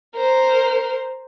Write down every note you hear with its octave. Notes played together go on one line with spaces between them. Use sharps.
A#4 C5